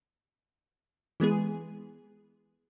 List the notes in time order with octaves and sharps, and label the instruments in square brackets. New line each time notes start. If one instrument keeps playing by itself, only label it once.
[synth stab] E3 G#3 B3 G#4